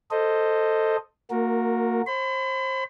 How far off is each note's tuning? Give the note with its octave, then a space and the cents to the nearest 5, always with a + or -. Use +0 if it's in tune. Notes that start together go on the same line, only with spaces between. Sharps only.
A4 +10 C5 +0 D#5 +0
A#3 -25 F#4 -25 A#4 +0
C5 +30 B5 +40